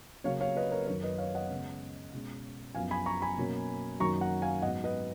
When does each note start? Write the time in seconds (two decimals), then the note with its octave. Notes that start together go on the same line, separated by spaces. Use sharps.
0.24 C#3 F#3 A#3 C#4 C#5 F5
0.41 C#5 F5
0.57 B4 D#5
0.71 A#4 C#5
0.87 F#2 D#3 F#3 C#4 A#4 C#5
1.03 B4 D#5
1.18 C#5 F5
1.35 D#5 F#5
1.50 C#3 G#3 B3
2.12 B2 G#3 C#4
2.75 F#2 F3 B3 F5 G#5
2.91 G#5 B5
3.06 A#5 C#6
3.22 G#5 B5
3.37 B2 F#3 A#3 C#4
4.00 F#2 D#3 F#3 A#3 C#4 A#5 C#6
4.21 F#5 A#5
4.42 F5 G#5
4.62 G#2 F#3 B3 D#5 F#5
4.84 B4 D#5